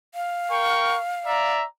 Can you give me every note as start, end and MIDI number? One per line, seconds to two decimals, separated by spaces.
0.14 1.52 77
0.50 0.98 70
0.50 0.98 79
0.50 0.98 85
1.26 1.64 74
1.26 1.64 76
1.26 1.64 82